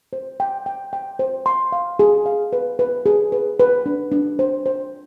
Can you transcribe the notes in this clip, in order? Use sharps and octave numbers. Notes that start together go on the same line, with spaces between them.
C5
G5
G5
G5
C5
C6
F5
G#4
F5
B4
B4
G#4
B4
B4
D4
D4
C5
C5